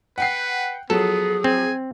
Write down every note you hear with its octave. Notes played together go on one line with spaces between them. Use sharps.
B4 F#5 G5 C7
F3 F#3 B3 G#4 A4
C4 G#5